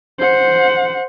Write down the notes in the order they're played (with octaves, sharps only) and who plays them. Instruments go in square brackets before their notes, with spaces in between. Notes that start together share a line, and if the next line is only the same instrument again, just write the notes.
[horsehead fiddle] C5 F#5